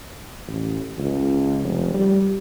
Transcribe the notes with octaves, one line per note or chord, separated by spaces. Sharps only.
A1
C#2
F1
G3